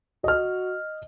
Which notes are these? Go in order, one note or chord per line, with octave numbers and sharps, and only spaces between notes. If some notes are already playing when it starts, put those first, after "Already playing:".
F#4 D#5 F6